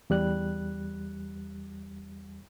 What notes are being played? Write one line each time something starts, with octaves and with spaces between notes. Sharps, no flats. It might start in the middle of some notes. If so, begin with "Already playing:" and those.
E2 G3 F#6